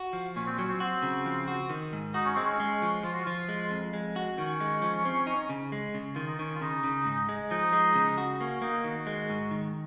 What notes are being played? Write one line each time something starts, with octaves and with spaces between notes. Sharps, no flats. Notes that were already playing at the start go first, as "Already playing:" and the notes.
Already playing: F#4
F3
A#2 C#4
C4
F#3 C#4
C4
C4 F#4
C#3
F3
F#4
D#3
G#2
D#4 F#4
C#4
G#3 C4
C#4
G#3
F3
F3 F4
F#4
F3 F4
G#3
F2
G#3
F#4
D#3 C#4
G#3
F3
C4
D#4
C#3
G#3
C#3
D#3 F4
D#4
D#3 C#4
F4
C#3 D#4
C#3
G#2
G#3
F3 D#4
G#3
C#3
F#4
A#3 C#4
A#3 D#4
D#3 F#4
G#3
G#2
D#3